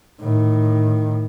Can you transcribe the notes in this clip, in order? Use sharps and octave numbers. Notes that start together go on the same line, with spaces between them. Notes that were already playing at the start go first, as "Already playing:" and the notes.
A2 D#3